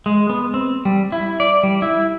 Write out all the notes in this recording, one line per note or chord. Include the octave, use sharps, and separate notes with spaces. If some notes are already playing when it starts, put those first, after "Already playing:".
G#3
B3
C4
G3
E4
D5
G3
E4